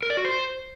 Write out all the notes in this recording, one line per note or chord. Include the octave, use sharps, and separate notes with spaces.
A#4
D5
F#4
C5